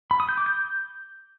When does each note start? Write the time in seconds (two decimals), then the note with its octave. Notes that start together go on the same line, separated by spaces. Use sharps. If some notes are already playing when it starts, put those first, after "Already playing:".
0.11 B5
0.20 D#6
0.29 G6
0.37 D6
0.46 G6